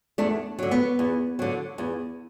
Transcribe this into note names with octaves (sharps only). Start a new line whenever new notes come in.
E2 A3 D4
D3 F#3
B3
E2
D3 F#3
E2